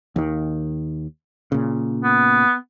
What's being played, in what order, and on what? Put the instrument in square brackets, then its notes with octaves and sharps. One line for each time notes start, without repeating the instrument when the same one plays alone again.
[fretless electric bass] D#2 D#3
A#2 C#3
[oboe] B3